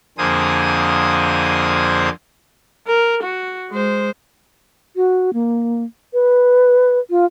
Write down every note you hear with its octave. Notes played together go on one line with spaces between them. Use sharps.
F2 D3 A#3 G#4 C5 D#6
A#4
F#4
G#3 C5
F#4
A#3
B4
F4